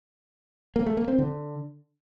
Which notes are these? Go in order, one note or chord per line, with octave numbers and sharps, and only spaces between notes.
A#3
A3
A#3
C4
D3